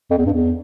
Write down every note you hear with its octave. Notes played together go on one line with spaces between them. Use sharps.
F2
E2
G2
E2